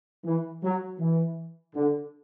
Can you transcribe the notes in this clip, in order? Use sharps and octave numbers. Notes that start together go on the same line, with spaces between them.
E3
F#3
E3
D3